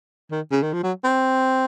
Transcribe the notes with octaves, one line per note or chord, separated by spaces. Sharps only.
D#3
C#3
D#3
F3
F#3
C4